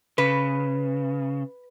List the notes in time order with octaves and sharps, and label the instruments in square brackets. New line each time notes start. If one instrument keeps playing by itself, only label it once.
[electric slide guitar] C#3 [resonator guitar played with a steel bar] B4